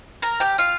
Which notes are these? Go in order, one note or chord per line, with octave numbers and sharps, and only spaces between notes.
A#4 A#5
G4 G5
F4 F5